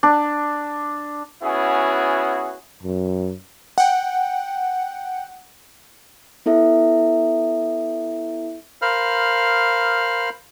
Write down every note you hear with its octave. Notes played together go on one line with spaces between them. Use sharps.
D4
B3 C#4 E4 F#4 G#4
F#2
F#5 G5
B3 E4 A4 E5
A#4 C5 F5 B5 F6